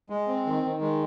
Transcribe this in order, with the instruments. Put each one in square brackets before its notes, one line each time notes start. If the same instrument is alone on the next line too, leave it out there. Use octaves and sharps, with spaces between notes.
[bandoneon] G#3
C4
D#3
D#3
G#3